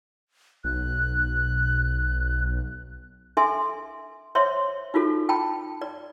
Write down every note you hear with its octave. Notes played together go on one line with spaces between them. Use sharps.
B1 F#6
D4 A4 E5 G#5 C6
C5 C#5 E5 C6
D#4 F4 F#4 A4
G5 A5 B5
D5